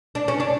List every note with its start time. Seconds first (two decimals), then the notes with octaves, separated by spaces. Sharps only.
0.15 D4
0.28 C#4
0.40 D4